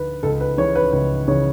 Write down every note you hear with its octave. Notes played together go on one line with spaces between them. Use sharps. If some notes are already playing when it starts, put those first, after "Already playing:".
Already playing: D2 B4
C#2 A4
B4
C#3 E3 C#5
B4
C#2 B4
C#3 E3 C#5